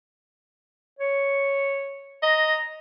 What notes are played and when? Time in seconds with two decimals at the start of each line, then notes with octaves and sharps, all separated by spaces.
0.99 C#5
2.23 D#5 A#5